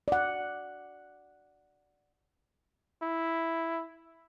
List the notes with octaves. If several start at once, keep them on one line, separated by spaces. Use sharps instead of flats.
D5 F#5
E4